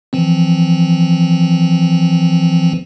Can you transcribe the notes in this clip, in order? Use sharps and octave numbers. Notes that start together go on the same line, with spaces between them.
E3 F3 C4